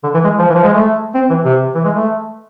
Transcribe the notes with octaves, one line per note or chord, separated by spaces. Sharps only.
D3
E3
G#3
F3
E3
F3
G#3
A3
C4
E3
C3
E3
G#3
A3